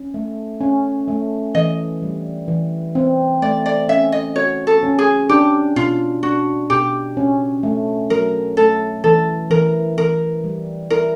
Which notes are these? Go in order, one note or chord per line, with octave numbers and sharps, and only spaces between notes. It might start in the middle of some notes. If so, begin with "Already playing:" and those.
Already playing: C#4
A3
C#4
A3
E3 D#5
G3
E3
C4
A3 D5
D5
C#4 E5
D#5
F#4 C#5
A4
C#4
G#4
D4 G4
B2 F4
D4 F#4
B2 G4
C#4
A3
F#3 A#4
A3 A4
E3 A4
E3 A#4
E3 A#4
G3
E4 A#4